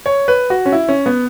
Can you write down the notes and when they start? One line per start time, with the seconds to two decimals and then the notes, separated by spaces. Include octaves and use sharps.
0.06 C#5
0.28 B4
0.50 F#4
0.66 C#4
0.72 E4
0.88 C#4
1.06 B3